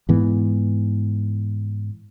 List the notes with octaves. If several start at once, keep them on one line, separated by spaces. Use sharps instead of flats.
G#2 E3 B3